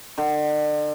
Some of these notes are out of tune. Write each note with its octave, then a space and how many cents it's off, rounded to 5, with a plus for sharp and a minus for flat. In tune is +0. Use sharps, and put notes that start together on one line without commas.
D3 +40